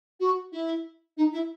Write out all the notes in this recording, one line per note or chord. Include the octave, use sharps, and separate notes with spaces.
F#4
E4
D#4
E4